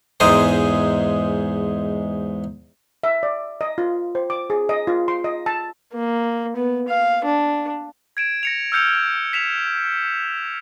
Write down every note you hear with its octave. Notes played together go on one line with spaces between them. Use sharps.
E2 G#2 G#3 G#4 C5 A#5
E5
D5
D#5
F4
C5
D6
G#4
D#5
F4
C6
D#5
A5
A#3
B3
F5
D4
G#6 D7 E7
A#6 C#7 F7
E6 F6 G6 C#7 F7
B6 E7 F7